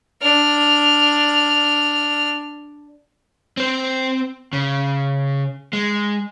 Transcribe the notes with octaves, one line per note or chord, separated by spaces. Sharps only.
D4 F6
C4 C5
C#3
G#3